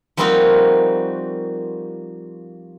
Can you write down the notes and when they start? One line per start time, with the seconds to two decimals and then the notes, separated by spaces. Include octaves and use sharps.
0.17 F3 G3 A#3 C4 D#4 F#4